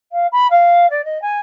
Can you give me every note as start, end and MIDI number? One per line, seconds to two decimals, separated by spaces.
0.12 0.27 77
0.32 0.47 83
0.51 0.89 77
0.91 1.04 74
1.05 1.21 75
1.22 1.40 80